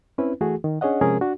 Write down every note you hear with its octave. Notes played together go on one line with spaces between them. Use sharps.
C4 C#4 E4 B4
E3 A3 F#4 G#4
D#3
C#4 D4 G#4 C#5 D#5 F#5
C3 F3 G#3 C#4 G#4 A#4
D4 F#4